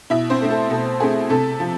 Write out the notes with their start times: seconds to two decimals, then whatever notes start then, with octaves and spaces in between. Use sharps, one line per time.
0.10 B2 E4 E5
0.30 C4 C5
0.41 A3 C4
0.50 A4
0.70 B2 A4
1.00 A3 C4 G#4
1.30 C3 A4
1.60 F3